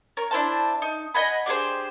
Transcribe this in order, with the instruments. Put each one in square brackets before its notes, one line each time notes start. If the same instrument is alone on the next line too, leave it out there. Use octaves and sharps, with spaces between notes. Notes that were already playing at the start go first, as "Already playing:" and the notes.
[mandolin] A#4 C#5
D4 E4 C5 A5
D#4
D#5 F#5 G#5 B5
D4 G4 G#4 C5